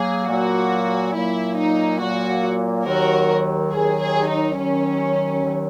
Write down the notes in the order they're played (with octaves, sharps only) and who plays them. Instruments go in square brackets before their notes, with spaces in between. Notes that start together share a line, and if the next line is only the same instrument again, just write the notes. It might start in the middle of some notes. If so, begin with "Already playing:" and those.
Already playing: [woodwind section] F#3 A#3 [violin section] G#4
[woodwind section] A#2 F#3 A#3 [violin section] F#4
[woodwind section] A#2 F#3 A#3 [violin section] E4
[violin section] D#4
[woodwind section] A#2 F#3 A#3 [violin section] F#4
[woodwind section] D#2 D#3 F#3 [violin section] F#4 A#4
[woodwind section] D#2 D#3 F#3 [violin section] G#4
[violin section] G#4
D#4
[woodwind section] D#2 D#3 F#3 [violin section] C#4
[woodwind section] D#2 D#3 F#3